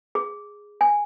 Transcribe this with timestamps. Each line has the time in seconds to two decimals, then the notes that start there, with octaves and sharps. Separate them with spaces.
0.15 G#4
0.81 G#5